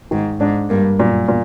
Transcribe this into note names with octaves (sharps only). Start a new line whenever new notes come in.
G#2 D#3
G#2 D4
G2 A#3
F#2 A#2
A#2